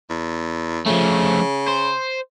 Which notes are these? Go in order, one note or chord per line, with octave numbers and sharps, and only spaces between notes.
E2
C#3 F3 A3
C5